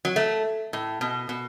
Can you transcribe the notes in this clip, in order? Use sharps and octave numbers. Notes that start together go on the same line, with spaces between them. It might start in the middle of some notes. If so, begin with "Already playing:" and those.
F#3
A3
A2
B2
B2